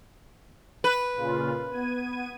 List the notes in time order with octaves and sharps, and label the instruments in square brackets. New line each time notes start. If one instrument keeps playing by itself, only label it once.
[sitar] B4
[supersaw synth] A#2 C#3 F4
B3 G#6 D#7